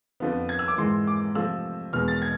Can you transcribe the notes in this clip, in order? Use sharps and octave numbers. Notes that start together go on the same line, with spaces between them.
F2 D3 F3 B3
G#6
E6
D6
G#2 E3 G#3 C6
D6
C3 F3 A3 C4 E6
E2 B2 G#3 B3 F6
A6
G#6